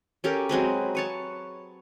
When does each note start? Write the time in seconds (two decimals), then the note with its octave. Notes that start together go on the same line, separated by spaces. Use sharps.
0.24 C#4 G4 A4 A#4
0.49 F#3 G#3 C4 B4
0.95 B4 C#5 A5